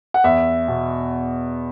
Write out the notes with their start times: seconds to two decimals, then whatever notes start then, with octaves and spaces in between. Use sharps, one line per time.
0.14 F#5
0.24 E2 E5
0.68 B2